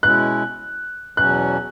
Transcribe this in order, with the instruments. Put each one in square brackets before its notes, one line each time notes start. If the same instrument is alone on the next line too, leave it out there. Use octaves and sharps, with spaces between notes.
[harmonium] B2 G#3 C#4 E4 [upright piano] F#6
[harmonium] E2 B2 F#3 C#4 [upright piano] F#6